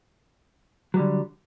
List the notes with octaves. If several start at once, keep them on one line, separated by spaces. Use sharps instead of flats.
D3 F#3 G3